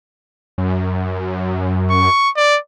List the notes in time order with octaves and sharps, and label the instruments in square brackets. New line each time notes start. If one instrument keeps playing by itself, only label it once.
[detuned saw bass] F#2
[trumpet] C#6
D5